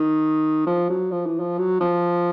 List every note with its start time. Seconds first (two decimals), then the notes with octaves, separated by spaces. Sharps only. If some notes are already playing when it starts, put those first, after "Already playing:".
Already playing: D#3
0.66 F3
0.90 F#3
1.11 F3
1.26 E3
1.39 F3
1.58 F#3
1.80 F3